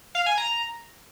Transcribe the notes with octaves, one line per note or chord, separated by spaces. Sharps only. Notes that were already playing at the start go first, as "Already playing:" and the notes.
F5
G#5
A#5